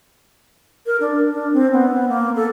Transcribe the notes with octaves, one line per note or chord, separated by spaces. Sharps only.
A#4
D4
D4
C4
B3
A#3
A4